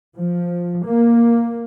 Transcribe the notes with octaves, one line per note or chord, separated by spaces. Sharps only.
F3
A#3